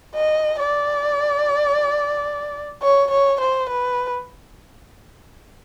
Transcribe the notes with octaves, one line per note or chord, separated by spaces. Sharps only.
D#5
D5
C#5
C#5
C5
B4